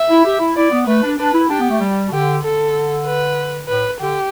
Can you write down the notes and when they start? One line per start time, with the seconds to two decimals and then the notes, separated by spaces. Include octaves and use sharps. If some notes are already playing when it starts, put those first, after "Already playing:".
Already playing: E5
0.10 E4
0.25 G4
0.40 E4
0.56 E4 D5
0.71 B3
0.87 A3 B4
1.03 D4
1.19 D4 B4
1.34 E4
1.50 D4 G4
1.60 B3
1.71 A3
1.81 G3
2.07 B2
2.12 D3 G4
2.43 D3 A4
3.06 B4
3.68 A2 B4
4.00 D3 G4